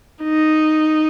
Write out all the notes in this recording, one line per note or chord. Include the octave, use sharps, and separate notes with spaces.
D#4